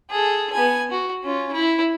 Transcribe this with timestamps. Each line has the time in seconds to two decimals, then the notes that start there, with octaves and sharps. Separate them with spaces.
0.10 G#4 A4
0.52 B3 G#5
0.91 F#4
1.24 C#4 F4
1.52 E4